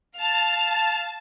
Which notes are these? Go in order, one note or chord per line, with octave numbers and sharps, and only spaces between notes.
F5 A5 F7